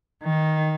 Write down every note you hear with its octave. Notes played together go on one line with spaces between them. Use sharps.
D#3